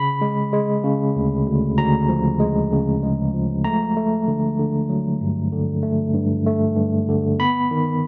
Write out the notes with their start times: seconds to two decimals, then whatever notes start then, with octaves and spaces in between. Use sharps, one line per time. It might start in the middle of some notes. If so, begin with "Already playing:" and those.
Already playing: C#3 B5
0.21 G#3
0.53 G#3
0.84 C#3
1.16 D2
1.46 D2
1.77 D2 A#5
2.09 F3
2.40 G#3
2.72 C#3
3.03 G#3
3.34 F3
3.64 A3 A#5
3.96 A3
4.28 D3
4.59 D3
4.89 F#3
5.21 G2
5.53 D3
5.83 A3
6.14 G2
6.46 A3
6.76 G2
7.08 D3
7.39 B3 B5
7.71 D#3